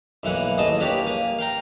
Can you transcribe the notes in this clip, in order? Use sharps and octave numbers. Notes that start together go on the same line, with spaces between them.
B1 E3 A#3 F#5 G#5
A1 D#2 G#4 D#5 G#5 A5
A#3 D4 G4 B4 C#5 D5
A#3 G#5
F5 G5 A#5